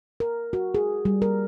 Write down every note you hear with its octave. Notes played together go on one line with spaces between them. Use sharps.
A#4
F#4
G#4
G3
A#4